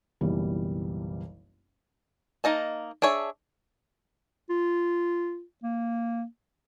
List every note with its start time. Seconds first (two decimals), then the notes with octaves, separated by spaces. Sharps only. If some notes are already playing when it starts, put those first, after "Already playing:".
0.21 F#1 B1 E3 G3
2.44 A#3 D#4 D#5 A5
3.02 D4 G#4 C#5 E5
4.50 F4
5.63 A#3